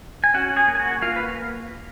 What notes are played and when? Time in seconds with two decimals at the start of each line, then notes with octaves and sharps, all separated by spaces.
0.24 G#5
0.34 C#4 F#4 F#5
0.56 G#4 G#5
0.68 A#3
0.75 G#5
0.79 F#4 F#5
1.02 A#3 F4 F5
1.16 B4